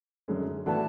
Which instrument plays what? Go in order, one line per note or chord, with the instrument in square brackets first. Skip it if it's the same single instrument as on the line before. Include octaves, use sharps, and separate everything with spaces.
[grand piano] F#2 D3 G#3 C#4
[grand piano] A2 E3 B3 D4 F#4 [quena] A5